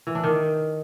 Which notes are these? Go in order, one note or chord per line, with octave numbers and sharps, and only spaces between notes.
E3
D4
D#3